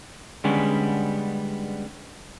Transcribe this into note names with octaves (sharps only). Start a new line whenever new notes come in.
D3 G3 G#3 B3 C#4